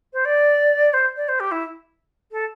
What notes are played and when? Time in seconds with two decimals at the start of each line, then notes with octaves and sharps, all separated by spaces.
0.13 C5
0.25 D5
0.93 C5
1.16 D5
1.28 C5
1.40 G4
1.51 E4
2.31 A4